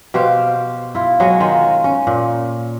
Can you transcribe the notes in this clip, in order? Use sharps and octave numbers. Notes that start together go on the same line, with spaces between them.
B2 G4 C5 F5
E4 F4
F#3 G#3 C#5 D#5
D#3 G#3 F4
C#4
A#2